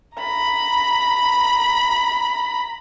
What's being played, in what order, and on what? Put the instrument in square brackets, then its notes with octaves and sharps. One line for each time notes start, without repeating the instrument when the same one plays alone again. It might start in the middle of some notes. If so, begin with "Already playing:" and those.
[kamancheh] A#5 B5